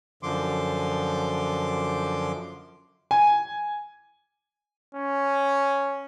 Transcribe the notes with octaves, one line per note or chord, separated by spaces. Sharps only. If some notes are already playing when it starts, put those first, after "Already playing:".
F#2 D3 F3 C6 D6
G#5
C#4